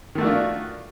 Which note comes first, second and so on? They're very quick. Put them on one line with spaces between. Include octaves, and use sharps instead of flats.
D#3 A3 F#4 D4 F4